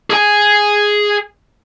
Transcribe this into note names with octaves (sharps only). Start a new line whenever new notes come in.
G#4 G#5